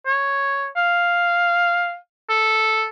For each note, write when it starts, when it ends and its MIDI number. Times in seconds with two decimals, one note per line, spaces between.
0.06 0.66 73
0.77 1.96 77
2.29 2.86 69